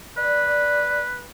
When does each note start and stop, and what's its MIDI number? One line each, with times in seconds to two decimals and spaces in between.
0.17 1.27 71
0.17 1.00 74